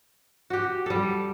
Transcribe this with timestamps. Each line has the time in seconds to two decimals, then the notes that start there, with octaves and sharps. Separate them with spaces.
0.50 F#4 G4
0.86 G3 A4